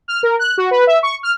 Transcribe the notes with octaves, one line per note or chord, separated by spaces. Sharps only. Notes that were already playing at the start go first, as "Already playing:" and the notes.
F6
A#4
F#6
F#4
B4
E5
C#6
F6